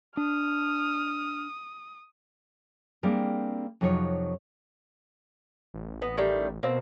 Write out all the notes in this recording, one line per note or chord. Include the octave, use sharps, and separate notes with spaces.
D4 D#6 F6
G3 A#3 C4 D4 G#4 A#4
F2 C3 F#3 D#4 F4 C#5
A1
B3 D#5
D#3 G3 A3
B2 A#3 C4